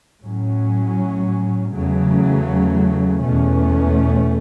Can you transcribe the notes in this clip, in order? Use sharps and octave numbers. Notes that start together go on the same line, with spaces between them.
A2 F#3 C#4
E2 C#3 F#3 A3
E2 B2 A3 C#4